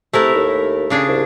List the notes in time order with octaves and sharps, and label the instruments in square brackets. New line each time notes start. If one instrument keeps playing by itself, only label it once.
[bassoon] C3 [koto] A3 E4 A#4
[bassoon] D#2
[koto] C#3 D4 G#4
[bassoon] C2